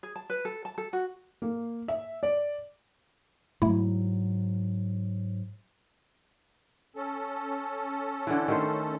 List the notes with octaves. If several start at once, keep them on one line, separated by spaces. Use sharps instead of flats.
G#4
A5
B4
A4
A5
A4
F#4
A#3
E5
D5
G#2 F#3 A3 E4
C#4 A4
D3 E3
D#3 A3 C5